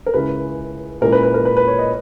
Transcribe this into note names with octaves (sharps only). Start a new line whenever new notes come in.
A#4
C#2 C#3 G#3 C#4 E4 B4
A#2 G#3 C#4 E4 A#4
B4
B4
A#4
B4
B4
C#5
D#5